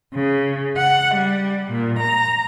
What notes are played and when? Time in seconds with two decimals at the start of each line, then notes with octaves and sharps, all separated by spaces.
0.14 C#3
0.76 F#5
1.14 G3
1.70 A#2
1.98 A#5